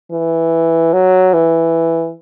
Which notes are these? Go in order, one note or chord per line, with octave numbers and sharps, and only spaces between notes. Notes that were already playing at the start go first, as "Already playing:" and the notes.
E3
F#3
E3